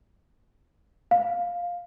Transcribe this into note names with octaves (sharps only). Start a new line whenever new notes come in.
F5